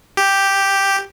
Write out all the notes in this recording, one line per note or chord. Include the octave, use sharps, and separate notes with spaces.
G4